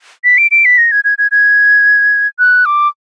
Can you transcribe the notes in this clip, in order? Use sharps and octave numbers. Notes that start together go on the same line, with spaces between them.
B6
D7
D7
B6
A#6
G#6
G#6
G#6
G#6
F#6
D6